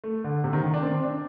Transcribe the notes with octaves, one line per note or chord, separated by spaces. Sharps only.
A3
D3
C3
D#3
D#3
D4
C4
D4